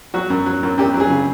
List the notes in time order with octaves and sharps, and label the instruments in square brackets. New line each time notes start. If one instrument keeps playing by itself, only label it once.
[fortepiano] F#3 F#4
F#2
F#3
F#2
F#2 G4
F#3
G#4
C#3